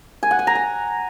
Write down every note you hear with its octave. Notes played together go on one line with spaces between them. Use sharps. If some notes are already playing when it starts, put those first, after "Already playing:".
G#5
F#5
G#5
A#5
G#5